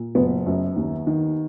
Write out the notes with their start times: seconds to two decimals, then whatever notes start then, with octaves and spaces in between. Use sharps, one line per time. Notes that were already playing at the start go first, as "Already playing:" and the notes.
Already playing: A#2
0.15 F#1 B3
0.46 F#2
0.76 D#2
1.07 D#3